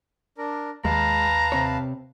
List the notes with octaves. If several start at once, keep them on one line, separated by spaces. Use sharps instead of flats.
D4 A#4
D#2 G#3 B4 F5 A5 A#5
C3 C4 C#5